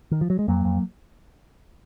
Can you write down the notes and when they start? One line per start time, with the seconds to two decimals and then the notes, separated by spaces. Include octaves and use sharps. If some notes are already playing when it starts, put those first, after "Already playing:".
0.11 D#3
0.21 F3
0.30 F#3
0.39 G#3
0.48 F2 F#3 A#3
0.65 F2